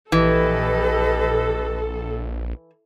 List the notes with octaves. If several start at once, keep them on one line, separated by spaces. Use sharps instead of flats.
A#1 E3 G4 A4 B4 D#5